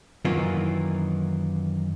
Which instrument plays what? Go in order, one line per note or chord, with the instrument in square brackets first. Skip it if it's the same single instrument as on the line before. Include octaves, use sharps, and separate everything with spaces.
[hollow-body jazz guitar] F#2 D#3 E3 A#3 F4